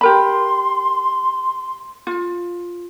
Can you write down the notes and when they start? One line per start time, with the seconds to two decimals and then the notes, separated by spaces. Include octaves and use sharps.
0.01 G4 A#4 B5 C6
2.07 F4